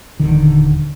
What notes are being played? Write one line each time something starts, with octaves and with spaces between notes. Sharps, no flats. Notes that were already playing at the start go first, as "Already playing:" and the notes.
D#1 D3 D#3